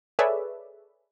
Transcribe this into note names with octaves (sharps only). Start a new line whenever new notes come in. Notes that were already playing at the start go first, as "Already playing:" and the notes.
G#4 A4 B4 C#5 D5 E5